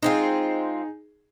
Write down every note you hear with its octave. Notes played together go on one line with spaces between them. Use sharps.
G#3 C4 D#4 F4 G#4